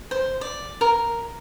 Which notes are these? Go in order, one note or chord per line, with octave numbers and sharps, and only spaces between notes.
C5
D5
A#4